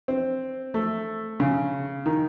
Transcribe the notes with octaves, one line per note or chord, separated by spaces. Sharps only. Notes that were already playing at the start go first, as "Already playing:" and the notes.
C4
A3
C#3
D#3